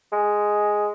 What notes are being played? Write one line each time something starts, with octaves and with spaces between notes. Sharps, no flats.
G#3